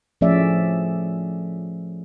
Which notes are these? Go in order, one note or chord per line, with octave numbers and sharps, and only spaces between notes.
F3 A3 C#4 G#4 D5 E5